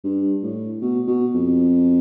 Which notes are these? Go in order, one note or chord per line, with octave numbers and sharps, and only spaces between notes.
G2
A2
B2
B2
F2